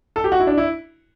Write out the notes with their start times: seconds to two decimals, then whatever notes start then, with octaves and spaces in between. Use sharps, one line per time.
0.16 A4
0.24 G4
0.32 F#4
0.40 E4
0.47 D4
0.57 E4